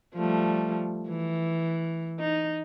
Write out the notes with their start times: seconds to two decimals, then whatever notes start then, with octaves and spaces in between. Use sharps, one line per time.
0.15 F3 G3 A3
1.08 E3
2.19 D#4